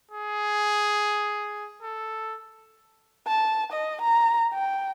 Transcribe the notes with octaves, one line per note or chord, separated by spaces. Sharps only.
G#4
A4
A5
D#5
A#5
G5